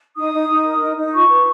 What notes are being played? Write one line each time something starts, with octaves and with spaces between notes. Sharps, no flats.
D#4 D#6
D#4
D#4
A#4
D#4
D#4
F4 C#6
B4